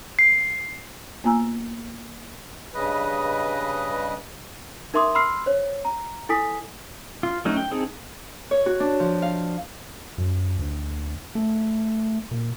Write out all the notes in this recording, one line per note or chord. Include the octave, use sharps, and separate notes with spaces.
C7
A#3 B3 F4 G#5 A#5 E6
G2 C#3 B4 D#5
D#4 A#4 E5 C6 D6 D#6
B5 C6 E6 F6 C7
C5 C#5
A#5
E4 A4 G#5 D#6 B6
F4
F#3 A3 C#4 D#4
G5
C4 D#4 G#4 A4
C#5
F#4
D4
F3
F5
F#2
D2
A3
A#2